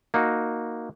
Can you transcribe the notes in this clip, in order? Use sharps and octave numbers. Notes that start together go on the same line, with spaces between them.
A#3 D#4 F#4